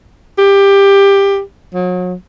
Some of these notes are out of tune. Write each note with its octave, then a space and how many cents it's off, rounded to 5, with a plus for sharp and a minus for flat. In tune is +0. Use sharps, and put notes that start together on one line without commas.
G4 +15
F#3 -35